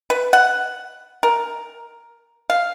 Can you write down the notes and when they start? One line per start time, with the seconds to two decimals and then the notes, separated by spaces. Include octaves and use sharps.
0.10 B4
0.33 F#5
1.23 A#4
2.50 F5